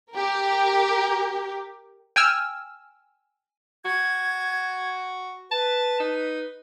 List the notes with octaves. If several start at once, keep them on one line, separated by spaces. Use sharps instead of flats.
G4 A#4
G5 G#5 E6 F6
F#4 G#6
B4 A5
D#4